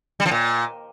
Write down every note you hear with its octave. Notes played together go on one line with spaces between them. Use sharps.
G3
F3
A#2